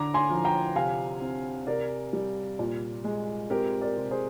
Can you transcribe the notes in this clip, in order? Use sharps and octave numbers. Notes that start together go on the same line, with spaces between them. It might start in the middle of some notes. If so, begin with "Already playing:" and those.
Already playing: D3 A#5 D6
G#5 C6
F3
G5 A#5
C3 F5 G#5
C4
C3 A#4 D5
G3
A#2
G#3
C4 G4 A#4
A#4 D5
C3
G#4 C5